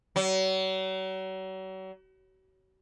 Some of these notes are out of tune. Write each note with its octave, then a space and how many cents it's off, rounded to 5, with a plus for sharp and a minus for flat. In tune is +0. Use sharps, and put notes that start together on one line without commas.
F#3 +40